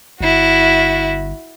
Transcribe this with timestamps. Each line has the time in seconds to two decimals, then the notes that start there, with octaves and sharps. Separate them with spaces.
0.21 G1 E4 F#4